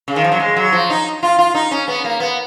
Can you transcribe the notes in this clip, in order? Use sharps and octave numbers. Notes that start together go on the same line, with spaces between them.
C#3
D#3
F3
F#3
G#3
F#3
F3
D#4
F4
F4
D#4
C#4
B3
A#3
B3